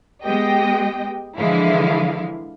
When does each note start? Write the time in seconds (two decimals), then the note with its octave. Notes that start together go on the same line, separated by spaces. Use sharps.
0.24 G#3 B3 G4 D#5 G5
1.38 D3 E3 F3 G#3 E4 F5